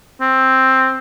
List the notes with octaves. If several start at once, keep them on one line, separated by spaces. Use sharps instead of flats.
C4